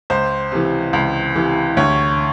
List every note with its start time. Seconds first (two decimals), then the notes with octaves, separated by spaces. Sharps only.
0.10 C#2 C5
0.52 C3 E3
0.93 C#2
1.35 C3 E3
1.77 D2 C#5